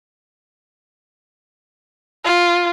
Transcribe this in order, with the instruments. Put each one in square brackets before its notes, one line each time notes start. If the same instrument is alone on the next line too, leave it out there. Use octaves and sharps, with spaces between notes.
[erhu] F4